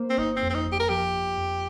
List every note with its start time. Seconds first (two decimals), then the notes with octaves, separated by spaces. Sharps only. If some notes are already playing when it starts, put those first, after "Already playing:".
Already playing: A#3 C5
0.10 C4
0.18 G1 D#4
0.36 C4
0.43 F2
0.50 C4
0.55 D#4
0.66 G1
0.72 G4
0.80 A#4
0.89 F3 G4
1.14 G1
1.38 F2